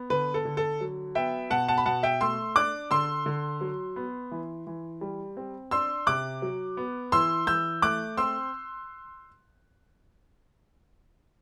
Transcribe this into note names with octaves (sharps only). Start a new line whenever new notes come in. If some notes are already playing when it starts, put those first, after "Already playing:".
Already playing: B3
D3 B4
A4
D3
A4
F#3
B3 E5 G5
B2 F#5 A5
F#5 A5
B5
B2 F#5 A5
E5 G5
A3 C6 E6
D4 D6 F#6
D3 C6 E6
D3
F#3
B3
E3
E3
G3
C4
D4 C6 E6
C3 D6 F#6
F#3
B3
E3 C6 E6
E3 E6 G6
A3 D6 F#6
C4 C6 E6